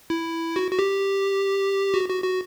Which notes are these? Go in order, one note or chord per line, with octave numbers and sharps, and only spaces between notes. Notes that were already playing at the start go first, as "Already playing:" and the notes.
E4
F#4
F#4
G4
F#4
F#4
F#4